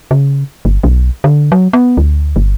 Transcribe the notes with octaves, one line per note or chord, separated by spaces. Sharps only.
C#3
G1
B1
D3
F#3
B3
D2
G1